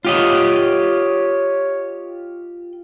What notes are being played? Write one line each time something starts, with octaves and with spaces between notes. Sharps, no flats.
F4 G4 C#5 D#5